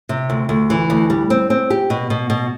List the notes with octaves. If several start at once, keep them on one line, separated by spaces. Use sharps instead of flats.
C3
D2
D2
E3
D2
G3
C4
C4
G4
B2
B2
B2